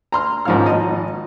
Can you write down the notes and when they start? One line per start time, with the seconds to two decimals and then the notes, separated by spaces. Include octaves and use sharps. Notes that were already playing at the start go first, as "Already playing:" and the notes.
0.12 A#5 C6 F6
0.45 G#2 D#3 F3 C#4 F4 F6
0.65 G#1 D#5